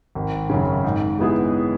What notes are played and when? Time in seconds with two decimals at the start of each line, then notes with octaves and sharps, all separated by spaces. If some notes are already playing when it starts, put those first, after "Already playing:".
0.15 G#1
0.50 F#2 C#3
0.84 G#2
1.19 G#3 B3 E4 G#4